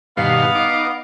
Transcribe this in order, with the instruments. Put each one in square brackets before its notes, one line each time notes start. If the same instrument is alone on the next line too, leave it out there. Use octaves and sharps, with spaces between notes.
[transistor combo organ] G2 B2 D#3 [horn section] B3 F5
[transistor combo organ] D#4 D6